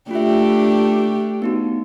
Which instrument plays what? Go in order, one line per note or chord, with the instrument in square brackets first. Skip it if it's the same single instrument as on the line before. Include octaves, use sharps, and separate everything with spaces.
[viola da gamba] A3 D4 G4 [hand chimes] F4 E5
[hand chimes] B3 D#4 F#4